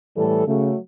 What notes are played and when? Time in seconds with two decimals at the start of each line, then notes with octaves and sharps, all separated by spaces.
0.17 A2 E3 G3 A4
0.46 C#3 F#3 A3